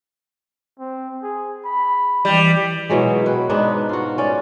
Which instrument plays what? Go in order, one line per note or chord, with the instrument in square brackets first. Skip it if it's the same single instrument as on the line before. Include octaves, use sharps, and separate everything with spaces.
[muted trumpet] C4
G#4
B5
[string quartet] E3 [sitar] G3
[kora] B2 E3 F#3 G#3
B4 G5
G#2 D4 D#4 B4
F4 F#4
C#4 D5